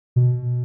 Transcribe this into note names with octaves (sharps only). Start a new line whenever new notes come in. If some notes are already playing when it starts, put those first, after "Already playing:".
B2